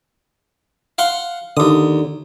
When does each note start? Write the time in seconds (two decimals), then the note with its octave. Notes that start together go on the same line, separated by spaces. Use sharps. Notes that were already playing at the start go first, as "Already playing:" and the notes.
0.98 F5 F#5 C6
1.57 D#2 D3 D#6